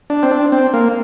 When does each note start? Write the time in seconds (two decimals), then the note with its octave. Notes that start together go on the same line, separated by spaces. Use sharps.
0.10 D4
0.23 C4
0.31 D4
0.52 C4
0.74 A#3